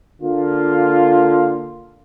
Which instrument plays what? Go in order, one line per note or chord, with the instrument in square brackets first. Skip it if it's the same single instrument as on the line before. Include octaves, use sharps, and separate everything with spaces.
[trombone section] D3 A#3 F4